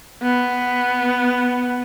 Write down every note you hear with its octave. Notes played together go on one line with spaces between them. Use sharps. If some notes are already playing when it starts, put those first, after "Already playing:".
B3